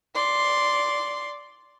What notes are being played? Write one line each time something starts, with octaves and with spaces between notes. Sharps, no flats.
D5 C6